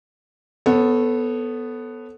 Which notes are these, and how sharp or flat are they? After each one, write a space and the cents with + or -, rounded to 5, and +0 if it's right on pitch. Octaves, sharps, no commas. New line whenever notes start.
B3 +0 A4 +0 C#5 -40